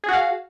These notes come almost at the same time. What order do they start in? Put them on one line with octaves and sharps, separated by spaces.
G#4 F#4 F5